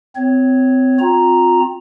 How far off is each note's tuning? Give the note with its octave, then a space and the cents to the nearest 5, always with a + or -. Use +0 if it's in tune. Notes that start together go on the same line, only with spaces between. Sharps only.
C4 -25 C#5 +0
C4 +0 F4 +30 A#5 +0